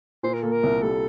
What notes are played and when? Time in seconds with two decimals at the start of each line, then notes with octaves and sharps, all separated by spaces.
0.23 A#2 C5
0.33 A#4
0.42 A#3 A4
0.52 A#4
0.63 C2
0.82 G3 A4